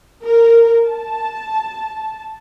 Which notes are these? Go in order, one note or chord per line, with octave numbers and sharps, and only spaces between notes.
A#4
A5